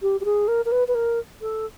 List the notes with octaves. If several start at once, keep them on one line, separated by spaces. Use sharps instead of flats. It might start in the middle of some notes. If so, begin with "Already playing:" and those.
G4
G4
G#4
A#4
A#4
B4
B4
A#4
A4